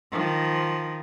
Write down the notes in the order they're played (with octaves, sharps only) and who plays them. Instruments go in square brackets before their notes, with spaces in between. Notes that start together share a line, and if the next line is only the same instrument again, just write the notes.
[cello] D#3 F3